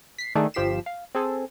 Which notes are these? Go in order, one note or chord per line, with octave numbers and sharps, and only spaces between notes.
B6 C7
D#3 A3 D4 G#4
G1 F3 G4 B6 C7 E7
F5
C4 G#4 A4